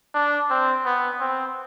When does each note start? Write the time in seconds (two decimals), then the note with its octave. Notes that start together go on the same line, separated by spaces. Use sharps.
0.15 D4
0.50 C4
0.86 B3
1.20 C4